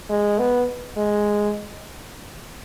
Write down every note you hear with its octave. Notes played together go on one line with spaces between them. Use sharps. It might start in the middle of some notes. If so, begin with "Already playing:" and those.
G#3
B3
G#3